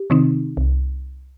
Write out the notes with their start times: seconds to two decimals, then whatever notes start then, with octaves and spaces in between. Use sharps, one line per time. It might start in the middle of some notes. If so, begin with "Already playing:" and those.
Already playing: G4
0.10 C3 D#3 C4 D#4
0.57 C2